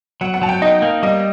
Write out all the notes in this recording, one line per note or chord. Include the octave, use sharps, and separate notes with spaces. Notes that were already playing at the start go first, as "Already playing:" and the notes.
F#3 F#5
F#5
F#3 A5
G5
D#4 D#5
A#3
G3 D#5